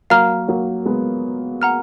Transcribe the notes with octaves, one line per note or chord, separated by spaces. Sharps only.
F#3 A#3 F5 A#5 F6
F#3 A#3
G#3 B3
F#5 A#5 F6